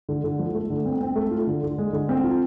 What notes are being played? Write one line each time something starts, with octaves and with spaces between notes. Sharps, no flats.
D3
D3
F3
A3
D3
C4
C4
A3
F4
D3
D3
G#3
D3
C4
F4